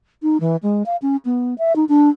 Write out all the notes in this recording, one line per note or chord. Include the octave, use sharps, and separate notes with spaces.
D#4
E3
G#3
F5
C#4
B3
E5
D#4
D4